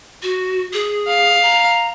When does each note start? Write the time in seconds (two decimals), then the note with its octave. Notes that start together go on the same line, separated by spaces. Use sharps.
0.23 F#4
0.73 G#4
1.08 F5
1.42 A#5